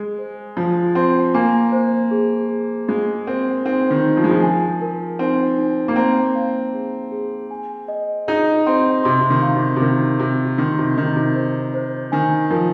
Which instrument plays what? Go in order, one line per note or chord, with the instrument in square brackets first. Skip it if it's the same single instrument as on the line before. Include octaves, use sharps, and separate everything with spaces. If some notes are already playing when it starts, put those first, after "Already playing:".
Already playing: [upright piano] G#3 [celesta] G#5
[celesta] C5
[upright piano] F3 [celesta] F4
[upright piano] C4 [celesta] C6
[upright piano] A#3 [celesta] G#5
[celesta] C5
G#4
G#4
[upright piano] G#3 [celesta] F5
[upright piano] C4 [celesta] A#4
[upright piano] C4 [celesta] D#4
[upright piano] D#3
[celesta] D#4
[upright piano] F3
G#3
F3
[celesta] G#5
A#4
[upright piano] C4 [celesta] D#4
[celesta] D#4
[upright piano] A#3
[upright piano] C4 [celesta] A#5
[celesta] F5
G#4
G#4
G#5
D#5
[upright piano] D#4 [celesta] G#4
[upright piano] C4 [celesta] C6
[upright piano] C3 [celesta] C6
[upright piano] C3
D#3
[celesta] F5
[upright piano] C3
C3
[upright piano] D#3 [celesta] A#4
[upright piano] C3 [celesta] A#4
[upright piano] D#3 [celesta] C6
[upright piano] C3
[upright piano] D#3 [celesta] D#5
[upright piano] C3
[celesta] C5
C5
[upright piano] D#3 [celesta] G#5
[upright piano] F3 [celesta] A#4